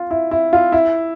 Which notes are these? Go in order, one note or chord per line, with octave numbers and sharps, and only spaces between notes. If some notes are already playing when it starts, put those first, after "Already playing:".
Already playing: F4
E4
E4
F4
E4